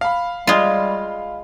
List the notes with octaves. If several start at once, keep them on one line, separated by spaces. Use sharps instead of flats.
F5 B5
G3 G#3 F4